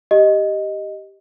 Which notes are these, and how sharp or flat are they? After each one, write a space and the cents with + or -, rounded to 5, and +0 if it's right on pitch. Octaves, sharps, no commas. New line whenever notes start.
G4 +0 D#5 +0